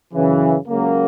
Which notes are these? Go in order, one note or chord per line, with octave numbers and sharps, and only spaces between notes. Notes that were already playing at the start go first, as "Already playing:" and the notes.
F#2 C#3 E3
C#2 C#3 F#3 A#3